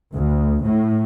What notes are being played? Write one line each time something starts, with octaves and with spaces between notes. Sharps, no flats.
D2
A2